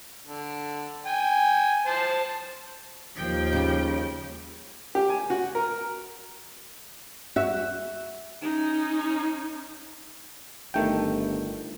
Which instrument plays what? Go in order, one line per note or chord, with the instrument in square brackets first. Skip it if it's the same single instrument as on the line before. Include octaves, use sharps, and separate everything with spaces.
[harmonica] D3
G5 G#5
C5 A5
[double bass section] D#2 [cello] F3 G5
[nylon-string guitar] C#3 G3
[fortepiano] G4
G#5
F#4
A#4
[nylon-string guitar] F#4 E5
[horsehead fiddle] C#4 D#4
[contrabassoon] G1 [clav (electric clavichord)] D#3 A3 G5